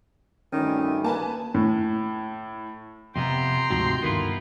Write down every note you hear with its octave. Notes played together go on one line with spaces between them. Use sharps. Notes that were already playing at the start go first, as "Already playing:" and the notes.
D2 G2 D#3 E3 C#4
A#3 B4 G#5 A5
A2
F2 C3 B3 G5 A#5 C6
D2 G#2 C3 F3 F#4
G2 D3 D#3 B3 E4 F4